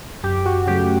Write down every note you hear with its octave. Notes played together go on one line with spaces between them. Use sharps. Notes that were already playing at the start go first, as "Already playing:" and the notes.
F#2 G4
F#4
C#3 F#3 A3 G4